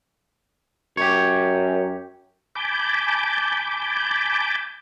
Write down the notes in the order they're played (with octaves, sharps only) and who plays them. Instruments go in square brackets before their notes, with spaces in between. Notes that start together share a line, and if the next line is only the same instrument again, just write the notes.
[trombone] F#2 [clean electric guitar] G4 C#5
[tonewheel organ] G#5 A5 B5 D6 G6